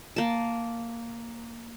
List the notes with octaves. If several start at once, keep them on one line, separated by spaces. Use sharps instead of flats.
A#3 A5